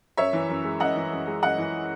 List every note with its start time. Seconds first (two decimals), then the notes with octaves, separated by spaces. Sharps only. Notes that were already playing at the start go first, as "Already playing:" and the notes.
0.17 F#2 C#5 E5
0.33 E3
0.49 F#2
0.64 G#3
0.80 F#2 D#5 F#5
0.96 E3
1.11 F#2
1.27 G#3
1.42 F#2 D#5 F#5
1.58 E3